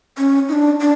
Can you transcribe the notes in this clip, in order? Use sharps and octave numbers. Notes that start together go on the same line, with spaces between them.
C#4
D#4
D4
D4